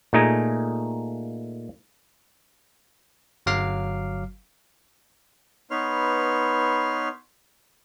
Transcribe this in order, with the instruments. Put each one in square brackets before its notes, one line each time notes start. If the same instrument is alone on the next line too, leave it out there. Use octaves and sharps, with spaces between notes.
[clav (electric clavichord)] A#2 A3 D#4 G#4 A#5
[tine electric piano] G1 F#3 F5 D6 F6 C7
[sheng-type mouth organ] B3 D#4 B4 C#5 C6 F6